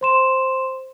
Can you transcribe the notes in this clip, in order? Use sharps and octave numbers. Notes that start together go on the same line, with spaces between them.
C5 C6 E7